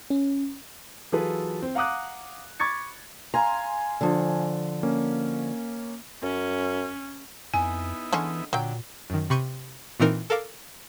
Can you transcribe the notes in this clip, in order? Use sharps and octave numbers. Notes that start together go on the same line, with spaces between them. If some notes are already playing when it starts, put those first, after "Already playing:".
C#4
E3 F#3 F4 G#4 A4 B4
C4
F5 F#5 A#5 D6 D#6 F#6
B5 C#6 D6 G#6 A6 C#7
F5 G#5 A#5 C6
D3 F3
A#3 C#4
F#2 C#4
F2 B3 D#4 E4 G#5
D3 E3 G#3 C#4
A#2 D3 F#3 G5
F#2 D#3
C3 B5 C#6 G6 C#7 D#7
A#2 E3 C4 D#4 A#4
A4 A#4 F5 D6